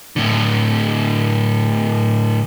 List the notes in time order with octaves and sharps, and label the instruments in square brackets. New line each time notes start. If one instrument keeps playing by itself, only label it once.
[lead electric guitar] A2 D3